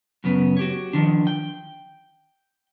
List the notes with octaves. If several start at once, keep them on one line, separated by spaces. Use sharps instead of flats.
F#2 C#3 B3
F#4 G4 C#5
D#3 F3 D4
G5